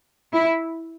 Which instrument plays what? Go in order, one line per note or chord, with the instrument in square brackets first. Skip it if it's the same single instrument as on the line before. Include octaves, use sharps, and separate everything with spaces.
[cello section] E4